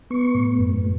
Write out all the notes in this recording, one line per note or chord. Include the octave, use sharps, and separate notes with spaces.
B3 C#6
A2
F#2